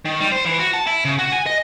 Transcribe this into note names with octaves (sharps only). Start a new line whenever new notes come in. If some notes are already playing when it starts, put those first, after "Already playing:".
D#3
G3
C5
E3
F#4
A5
E4
C#3
F#4
G#5
D#5